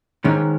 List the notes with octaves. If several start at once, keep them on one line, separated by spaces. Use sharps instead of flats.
G#2 D#3 G#3 C#4